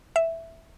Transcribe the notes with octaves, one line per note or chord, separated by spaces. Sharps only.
E5